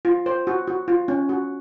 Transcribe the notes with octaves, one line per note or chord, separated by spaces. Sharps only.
F4
C5
F#4
F#4
F4
C#4
F#4